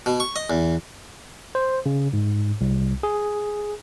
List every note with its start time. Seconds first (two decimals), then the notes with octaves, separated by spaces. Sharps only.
0.06 B2
0.20 C#6
0.36 D#5
0.50 E2
1.55 C5
1.86 C#3
2.13 G#2
2.61 C2
3.03 G#4